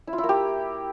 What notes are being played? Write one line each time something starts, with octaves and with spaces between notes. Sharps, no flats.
E4
F4
E4
A#3
G4